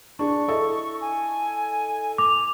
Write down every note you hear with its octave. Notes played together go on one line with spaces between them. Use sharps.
D4 G#4 C#6
E4 A4 D#5
G#5
D6 F7